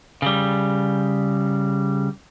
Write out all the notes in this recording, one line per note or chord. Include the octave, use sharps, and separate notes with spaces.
C#3 G3